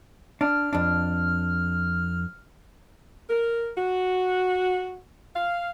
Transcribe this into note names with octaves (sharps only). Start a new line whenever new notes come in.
D4 F6
F2 D4
A#4
F#4
F5